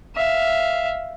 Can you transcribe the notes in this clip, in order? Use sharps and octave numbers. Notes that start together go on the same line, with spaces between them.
E5 F5